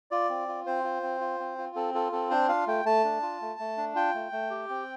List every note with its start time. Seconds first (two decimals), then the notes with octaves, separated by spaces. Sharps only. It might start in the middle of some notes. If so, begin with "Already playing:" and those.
0.11 F4 D5
0.29 C4
0.48 F4
0.66 C4 C5
0.84 F4
1.03 C4
1.21 F4
1.40 C4
1.58 F4
1.76 C4 A4
1.94 F4 A4
2.12 C4 A4
2.31 D4 C5
2.48 F4 F5
2.67 A3 G5
2.85 A3 A5
3.04 D4
3.22 F4
3.41 A3
3.60 A3
3.77 D4
3.95 F4 G5
4.14 A3
4.32 A3
4.50 G4
4.69 C4